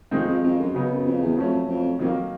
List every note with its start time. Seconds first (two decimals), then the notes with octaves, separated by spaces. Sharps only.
0.11 F2 D#3 G#3 C4 D#4
0.27 F2
0.44 F2
0.59 F#2
0.75 C#3 F#3 B3 D#4
0.90 F#2
1.06 F2
1.21 E2
1.36 F2 F#3 A3 C#4
1.68 F2
1.99 F2 D#3 F#3 A#3